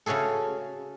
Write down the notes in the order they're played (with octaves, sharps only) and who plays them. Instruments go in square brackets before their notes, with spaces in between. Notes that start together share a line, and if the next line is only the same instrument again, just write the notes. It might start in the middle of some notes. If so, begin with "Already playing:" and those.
[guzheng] C#3 C#4 F#4 G#4 A4